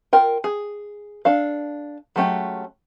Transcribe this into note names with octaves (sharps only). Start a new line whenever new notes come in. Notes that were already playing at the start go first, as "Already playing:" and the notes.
F4 A#4 G5
G#4
D4 A4 F5
F#3 G#3 A3 C#4 G4